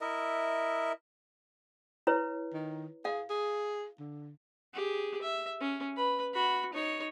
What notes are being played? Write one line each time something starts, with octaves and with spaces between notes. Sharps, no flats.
E4 A#4 D#5 E5
E4 B4 C#5
D#3
G#4 F5
G#4
D3
G4 G#4
E5
C#4
B4 B5
F#4 B5
D#4 C#5